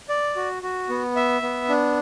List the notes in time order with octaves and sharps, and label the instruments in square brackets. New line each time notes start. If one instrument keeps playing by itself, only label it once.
[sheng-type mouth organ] D5
F#4
F#4
B3
E5
B3
D4